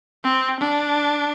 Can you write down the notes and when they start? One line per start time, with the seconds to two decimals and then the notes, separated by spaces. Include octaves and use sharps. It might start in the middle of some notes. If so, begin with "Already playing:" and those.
0.24 C4
0.60 D4